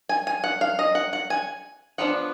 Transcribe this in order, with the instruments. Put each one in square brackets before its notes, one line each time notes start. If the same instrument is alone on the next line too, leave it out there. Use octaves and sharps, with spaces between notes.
[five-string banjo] G#5
G#5
F#5
F5
D#5
F#5
F#5
G#5
F3 B3 D4 F#5